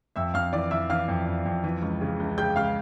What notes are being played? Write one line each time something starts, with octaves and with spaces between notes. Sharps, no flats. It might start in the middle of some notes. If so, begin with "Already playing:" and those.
F2 E5 E6
F2 F5 F6
E3 D5 D6
E3 E5 E6
E3 F5 F6
F2
F2
F2
E3
C#2
C#3
C#2
C#3 G5 G6
C#2 F5 F6